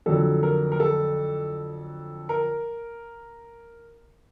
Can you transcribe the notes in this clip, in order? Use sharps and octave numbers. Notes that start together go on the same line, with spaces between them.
F2 D3 F#3 A4
A#4
A#4
A4
A#4